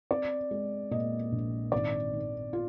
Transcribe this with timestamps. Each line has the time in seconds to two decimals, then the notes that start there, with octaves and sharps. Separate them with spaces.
0.11 C4 D5
0.51 G#3
0.91 A#2 D#5
1.32 A#1
1.72 G#1 D5
2.13 D#3
2.53 F4